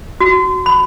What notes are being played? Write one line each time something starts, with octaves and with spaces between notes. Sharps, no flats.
F#4
B5